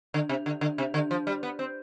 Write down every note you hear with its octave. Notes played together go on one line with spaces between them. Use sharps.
D3
C3
D3
D3
C3
D3
F3
G3
B3
C4